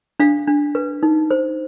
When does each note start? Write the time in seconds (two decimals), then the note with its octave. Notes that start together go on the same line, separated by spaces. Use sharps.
0.20 D4 F5
0.47 D4
0.75 B4
1.03 D#4
1.31 C5